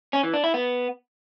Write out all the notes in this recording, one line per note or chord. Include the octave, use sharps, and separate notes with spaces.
C#4
E3
D4
E4
B3